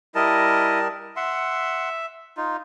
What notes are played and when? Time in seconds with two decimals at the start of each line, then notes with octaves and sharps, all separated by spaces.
0.15 G3 E4 A#4 D#5 A5
1.16 E5 F#5 C6
2.37 D#4 F4